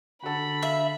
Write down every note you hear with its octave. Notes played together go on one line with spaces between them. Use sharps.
D3 F#4 A4 B5
E5 F5